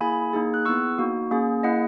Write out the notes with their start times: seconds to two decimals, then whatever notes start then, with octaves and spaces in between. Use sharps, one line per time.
0.01 A#3 E4 G#4 G#5 B5
0.33 A#3 D#4 G#4
0.54 F#6
0.65 B3 E4 G#4 C#6 E6
0.98 A#3 D#4 F#4
1.31 A#3 C#4 G#4
1.63 A#3 E4 G#4 D#5 F#5